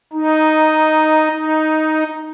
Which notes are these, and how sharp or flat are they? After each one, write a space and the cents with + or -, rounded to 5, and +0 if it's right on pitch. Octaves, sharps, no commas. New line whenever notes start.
D#4 +0
D#4 +5